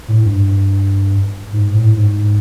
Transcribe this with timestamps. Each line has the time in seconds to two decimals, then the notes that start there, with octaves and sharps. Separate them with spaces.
0.08 A2
0.24 G2
1.53 G#2
1.74 A2
1.96 G#2